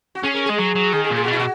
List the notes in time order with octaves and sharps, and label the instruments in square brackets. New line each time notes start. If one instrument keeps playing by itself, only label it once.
[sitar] F#4
[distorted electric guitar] C#4 [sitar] G#4
[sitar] A#4
G#4
[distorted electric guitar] G#3
[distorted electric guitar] F#3 [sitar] G#4
[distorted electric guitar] F#3
[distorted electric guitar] D#3 [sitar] G#4
[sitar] G#4
[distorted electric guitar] A#2
[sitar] G#4
F#4
[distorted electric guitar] B2 [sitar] E4
[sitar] F#4